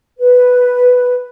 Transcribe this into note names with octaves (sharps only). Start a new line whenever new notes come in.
B4